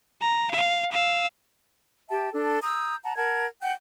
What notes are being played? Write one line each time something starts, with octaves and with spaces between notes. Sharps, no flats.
A#5
F5
F5 E6
G4 E5 G5 A5
D4 A4
A#5 D#6 E6 G6
F#5 A5 A#5
A#4 F#5 A5 G#6
F#5 G5 G6